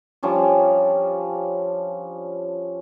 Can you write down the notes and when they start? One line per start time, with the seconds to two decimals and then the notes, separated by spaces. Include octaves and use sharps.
0.23 F3 G3 C#4 D4